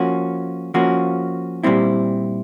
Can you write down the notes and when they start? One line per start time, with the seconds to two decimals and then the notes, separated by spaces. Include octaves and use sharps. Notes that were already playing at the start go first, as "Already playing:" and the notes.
Already playing: F3 A#3 C#4 F#4
0.74 F3 A#3 C#4 F#4
1.63 A#2 G3 C4 E4